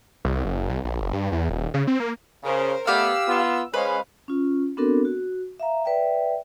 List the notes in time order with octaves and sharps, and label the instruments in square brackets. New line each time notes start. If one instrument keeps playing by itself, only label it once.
[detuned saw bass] C2
F#1
C2
A#1
F#1
G2
E2
D#1
C#3
C4
A#3
[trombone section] C#3 [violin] A#4 C5
[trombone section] A3 B3 [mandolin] G4 D5 F5 [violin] E6
[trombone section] B3 F4
[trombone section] G#3 C#4 [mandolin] B4 [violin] C5 F5
[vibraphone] C#4 F4
B3 C4 D4 F#4 A4 A#4
F#4
E5 F5 A#5
B4 D5 E5 G5